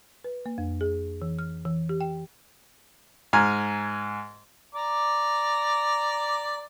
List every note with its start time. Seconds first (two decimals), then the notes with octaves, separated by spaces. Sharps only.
0.24 B4
0.46 A#3
0.58 F2
0.81 G#4
1.22 E3
1.39 F6
1.65 E3
1.89 G4
2.01 G5
3.33 G#2 G#5 A#5 F6
4.75 D5 A#5 D6